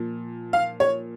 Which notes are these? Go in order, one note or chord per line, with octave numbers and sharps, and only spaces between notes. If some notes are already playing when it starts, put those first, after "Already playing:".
Already playing: A#2 F3
F5
C#5